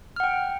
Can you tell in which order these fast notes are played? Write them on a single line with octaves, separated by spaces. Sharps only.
F6 F#5 G5